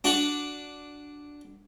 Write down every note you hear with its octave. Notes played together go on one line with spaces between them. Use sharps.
D4 F#4